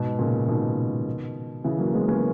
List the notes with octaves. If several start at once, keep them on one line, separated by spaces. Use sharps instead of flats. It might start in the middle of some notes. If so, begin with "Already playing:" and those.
Already playing: G#2 B2
A#2 C#3
B2 D#3
C#3 E3
F#3 A#3
G#3 B3
A#3 C#4